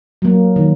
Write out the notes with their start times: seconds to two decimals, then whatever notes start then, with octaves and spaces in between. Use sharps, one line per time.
0.22 F#3 A#3
0.56 D#3